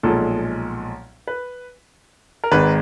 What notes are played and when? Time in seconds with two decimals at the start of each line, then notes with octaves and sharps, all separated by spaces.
0.03 B1 A#2 F3 G#3 A4
1.28 B4
2.44 A#4
2.52 G#1 G#2 D#3 G#3 B4